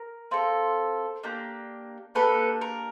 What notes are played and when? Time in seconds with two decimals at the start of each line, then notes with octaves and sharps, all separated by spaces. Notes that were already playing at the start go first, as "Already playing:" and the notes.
Already playing: A#4
0.31 C4 F4 A4
1.23 A#3 D4 G4
2.15 A#3 D4 G4 A4 B4
2.61 A#4